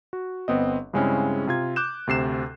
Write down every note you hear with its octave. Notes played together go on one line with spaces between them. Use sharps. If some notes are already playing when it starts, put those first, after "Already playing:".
F#4
G1 B3 C4 D#5
G2 C#3 G#3 C4 C#4 E4
C3 F4 G#6
D6 F#6 G6 E7
D2 C3 C7 E7